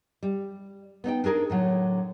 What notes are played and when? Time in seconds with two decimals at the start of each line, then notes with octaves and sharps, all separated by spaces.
0.23 G3
1.04 B3 D#4 D#5 G5
1.24 D4 D#4 G#4 A#4
1.50 A2 D3 F#3